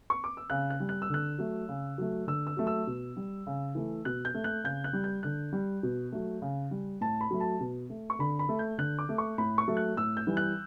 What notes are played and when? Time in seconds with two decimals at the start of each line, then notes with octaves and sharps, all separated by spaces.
0.10 C#6
0.24 D6
0.37 E6
0.50 C#3 F#6
0.70 F#6
0.80 G3
0.89 F#6
1.02 E6
1.10 D3 F#6
1.38 F#3 A3
1.69 C#3
1.98 F#3 A3
2.27 D3 E6
2.47 E6
2.57 F#3 A3
2.67 E6
2.87 B2
3.17 G3
3.47 C#3
3.75 E3 A3
4.05 B2 F#6
4.25 G6
4.34 A3
4.44 F#6
4.64 C#3 G6
4.84 F#6
4.93 G3
5.04 G6
5.23 D3 F#6
5.53 G3
5.83 B2
6.12 F#3 A3
6.42 C#3
6.71 G3
7.01 A2 A5
7.21 B5
7.31 F#3 A3
7.40 A5
7.60 B2
7.90 A3
8.10 C#6
8.19 D3 B5
8.39 B5
8.49 A3
8.59 G6
8.78 D3 F#6
8.99 D6
9.09 A3
9.18 C#6
9.38 A2 B5
9.58 C#6
9.68 F#3 A3
9.77 F#6
9.97 A2 E6
10.17 G6
10.27 E3 G3
10.37 F#6